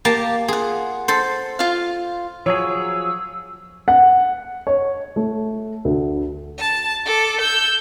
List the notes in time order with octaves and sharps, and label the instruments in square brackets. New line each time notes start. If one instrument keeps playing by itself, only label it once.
[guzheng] A#3 A5 [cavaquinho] G4 A#5
[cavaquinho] F4 F#5 [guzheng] G#4
[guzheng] A4 C5
[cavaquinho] F4 F5
[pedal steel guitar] F3 F#3 G#4 [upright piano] C#5 [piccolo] E6
[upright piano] F#5
C#5
A3
D2
[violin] A5
A4 D6
E6 G6